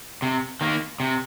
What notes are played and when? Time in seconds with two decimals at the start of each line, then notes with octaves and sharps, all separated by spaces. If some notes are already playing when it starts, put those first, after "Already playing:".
0.22 C3
0.61 D#3 A#3
1.00 C3